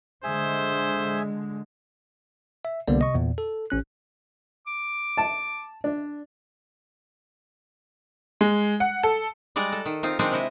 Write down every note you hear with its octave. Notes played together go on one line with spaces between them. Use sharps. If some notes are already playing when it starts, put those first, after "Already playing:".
D3 G#3 G#4 C5 E5 G#5
E5
C2 D3 G3 A#3 B3 D5
C3 D#5 C#6
E2 A#2
A4
A1 C#4 F#6
D6
A5
D4
G#3
F#5
A4
G3 G#3 D5 F#5 A#5
A4
D#3
C4 D#4 F4
D#3 G#3 C4 D4 D#4 F4
C3 E4 D#5